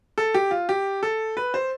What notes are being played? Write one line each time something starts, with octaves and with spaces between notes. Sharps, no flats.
A4
G4
F4
G4
A4
B4
C5